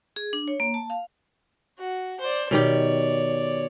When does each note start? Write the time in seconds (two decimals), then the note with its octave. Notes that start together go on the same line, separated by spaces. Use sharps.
0.16 G#4
0.33 D4
0.48 C#5
0.60 A#3
0.74 A5
0.90 F5
1.79 F#4
2.20 C5 D5
2.51 B2 D#3 G4 C#5 D5